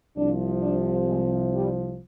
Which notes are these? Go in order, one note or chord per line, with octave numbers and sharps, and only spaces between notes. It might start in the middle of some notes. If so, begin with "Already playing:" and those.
C2 C3 F3 D4
D4
G#3
G3